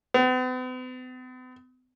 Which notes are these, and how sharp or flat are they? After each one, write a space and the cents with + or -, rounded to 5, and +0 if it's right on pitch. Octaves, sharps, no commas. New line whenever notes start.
B3 +45